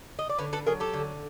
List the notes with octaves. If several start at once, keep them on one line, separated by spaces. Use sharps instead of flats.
D#5
D5
D3 B4 C#5
A4 B4
F#3 G#4 A#4
G4 A4
D3